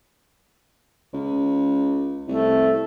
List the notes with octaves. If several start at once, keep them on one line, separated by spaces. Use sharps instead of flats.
C#2
C2 A3